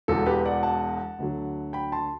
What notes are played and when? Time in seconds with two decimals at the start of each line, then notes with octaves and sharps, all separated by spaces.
0.08 E1 E2 B2 A4
0.26 G4 B4
0.45 D5 F#5
0.63 F#5 A5
1.19 D2 D3 F#3
1.73 G5 B5
1.92 A5 C6